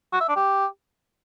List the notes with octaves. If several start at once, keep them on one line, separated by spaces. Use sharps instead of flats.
F#4
E5
D4
G4